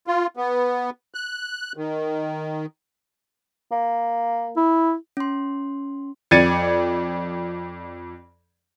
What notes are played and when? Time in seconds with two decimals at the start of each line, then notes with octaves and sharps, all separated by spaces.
0.07 F4
0.37 B3
1.14 F#6
1.77 D#3
3.71 A#3
4.57 E4
5.17 C#4 C6
6.31 F2 D5 G#6 A6 C#7 D#7